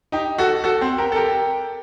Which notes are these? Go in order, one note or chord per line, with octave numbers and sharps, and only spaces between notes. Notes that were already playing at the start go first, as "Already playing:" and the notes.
D#4 G4
F#4 A4
F#4 A4
C4
G4 A#4
A4
G4 A#4